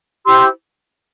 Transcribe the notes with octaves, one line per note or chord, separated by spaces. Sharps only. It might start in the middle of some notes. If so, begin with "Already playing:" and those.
E4 G4 C5 C6 E6